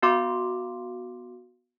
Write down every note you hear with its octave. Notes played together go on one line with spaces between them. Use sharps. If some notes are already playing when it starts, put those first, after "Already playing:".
B3 F#4 F5 C6 D6